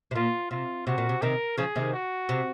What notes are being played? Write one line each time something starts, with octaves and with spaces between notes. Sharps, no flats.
C3
A#2 F4
C3 F4
C3 F#4
A#2
C3
C3 D#3 A#4
C#3 F3 G#4
C3 D#3
F#4
C3